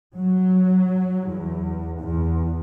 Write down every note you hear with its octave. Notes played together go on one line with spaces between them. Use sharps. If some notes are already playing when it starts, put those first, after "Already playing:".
F#3
E2
E2